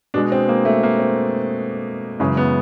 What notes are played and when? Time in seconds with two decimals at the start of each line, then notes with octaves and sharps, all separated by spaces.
0.14 B2 G#3 D4
0.32 C4
0.49 A#3
0.65 A3
0.83 A#3
0.99 C4
2.20 F#2 C#3 E3 G#3 C#4
2.37 B3